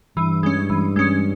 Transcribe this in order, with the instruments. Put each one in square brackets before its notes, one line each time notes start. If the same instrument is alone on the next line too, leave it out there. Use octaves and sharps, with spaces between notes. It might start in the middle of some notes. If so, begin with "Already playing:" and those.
[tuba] G2 [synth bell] E3
[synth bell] G#3 C#4
E3
G#3 C#4